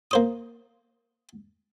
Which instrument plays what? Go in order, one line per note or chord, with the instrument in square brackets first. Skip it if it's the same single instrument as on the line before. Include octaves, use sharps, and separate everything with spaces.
[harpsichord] A#3 C5 D#6